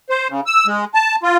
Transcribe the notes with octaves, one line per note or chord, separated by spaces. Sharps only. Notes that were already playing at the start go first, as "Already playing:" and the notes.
C5
C#3
E6
G#3
A5
F4